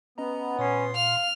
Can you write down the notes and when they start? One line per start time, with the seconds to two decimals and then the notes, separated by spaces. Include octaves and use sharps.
0.18 B3 C#4 D#5 A#5
0.59 A#2 C#4 C6 C7
0.96 F5 F6